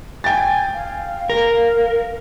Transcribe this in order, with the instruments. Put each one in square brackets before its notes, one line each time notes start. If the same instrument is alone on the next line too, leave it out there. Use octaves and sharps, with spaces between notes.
[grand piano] G5 A6 [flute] G#5
[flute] F5
[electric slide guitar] A#4